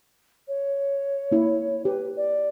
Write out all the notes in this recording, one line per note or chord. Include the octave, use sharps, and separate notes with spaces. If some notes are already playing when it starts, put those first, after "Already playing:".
C#5
A#3 E4
G4 B4
D5